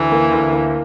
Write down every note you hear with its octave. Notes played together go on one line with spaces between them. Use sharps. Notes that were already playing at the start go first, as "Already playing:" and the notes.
Already playing: D2 E3
A#3
D2
A#3